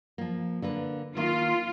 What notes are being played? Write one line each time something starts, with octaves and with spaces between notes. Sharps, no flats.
F3 A#3
D3 A#3 B4
D#3 A#3 F4